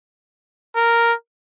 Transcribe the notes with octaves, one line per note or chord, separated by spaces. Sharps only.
A#4